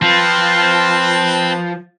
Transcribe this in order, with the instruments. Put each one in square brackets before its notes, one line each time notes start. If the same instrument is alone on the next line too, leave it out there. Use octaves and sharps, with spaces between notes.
[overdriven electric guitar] F3 [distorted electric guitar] C4 [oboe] F4 [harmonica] B4 A5